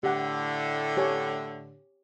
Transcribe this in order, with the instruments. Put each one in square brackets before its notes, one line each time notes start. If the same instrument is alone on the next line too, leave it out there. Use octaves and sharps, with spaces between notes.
[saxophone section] A2 D3 [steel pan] G4 F#5
[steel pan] G4 C#5 G#5